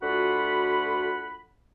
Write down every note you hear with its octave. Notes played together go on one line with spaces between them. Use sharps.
D2 D3 F4 F#4 F#5 B5